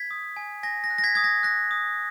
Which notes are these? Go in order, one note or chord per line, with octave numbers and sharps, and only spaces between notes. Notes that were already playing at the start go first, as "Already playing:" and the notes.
Already playing: G#6 B6
D#6
G#5
G#5 A#6
A#6
F#6
A#6
G#6 B6
D#6 G#6
A#6
F#6 A#6
D#6